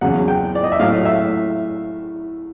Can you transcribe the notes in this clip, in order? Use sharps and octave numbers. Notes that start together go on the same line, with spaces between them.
E2 C#3 F#3 F#5
G5
D5
D#5
E5
A2 F#3 F5
E5